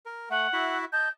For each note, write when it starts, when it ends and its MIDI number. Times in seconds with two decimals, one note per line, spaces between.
0.06 0.29 70
0.30 0.47 57
0.30 0.78 78
0.53 0.85 64
0.53 0.85 66
0.53 0.85 76
0.93 1.08 75
0.93 1.08 81
0.93 1.10 91